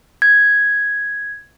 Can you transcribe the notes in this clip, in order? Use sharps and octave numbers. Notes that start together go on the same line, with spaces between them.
G#6